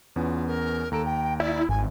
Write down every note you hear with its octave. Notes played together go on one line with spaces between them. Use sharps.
E2 B3 C#4 F4
A#4
D#2 A4 A#5 D7
G5
E4 D5
G#1 G#5